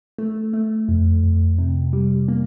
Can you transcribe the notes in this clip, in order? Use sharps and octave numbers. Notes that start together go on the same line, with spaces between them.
A3
A3
F2
F2
C3
G3
A#3